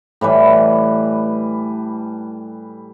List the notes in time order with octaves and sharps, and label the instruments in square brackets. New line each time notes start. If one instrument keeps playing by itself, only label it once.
[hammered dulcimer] A2 E3 G3 B4